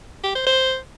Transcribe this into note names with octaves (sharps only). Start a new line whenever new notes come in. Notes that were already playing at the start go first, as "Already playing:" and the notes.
G4
C5
C5